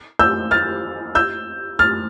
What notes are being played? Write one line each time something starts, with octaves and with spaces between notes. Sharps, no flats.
E6 G6
F6 A6
E6 G6
F6 A6